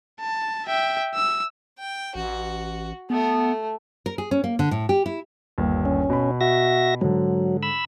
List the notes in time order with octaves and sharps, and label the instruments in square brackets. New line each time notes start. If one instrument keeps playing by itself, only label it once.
[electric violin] A5
E5 G5
E6
[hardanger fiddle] G5
[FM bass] A1 [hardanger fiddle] F#4
[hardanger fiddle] A3 [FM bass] B3
[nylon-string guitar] A#4
G#4
C#4
A#3
D3
A2
G4
E4
[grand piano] G1 D#2
[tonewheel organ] C#4
[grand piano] B2 B5
[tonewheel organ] F#4 E5 A#6
[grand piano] G#2 D3 [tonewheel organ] F#3
[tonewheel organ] B5 E6